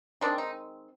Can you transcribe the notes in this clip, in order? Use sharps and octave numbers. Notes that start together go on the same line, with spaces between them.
D#3 G#3 C4 D4
D#4